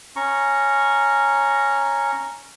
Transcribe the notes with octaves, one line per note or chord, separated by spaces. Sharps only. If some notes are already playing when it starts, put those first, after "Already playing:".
C#4 A#5 C#6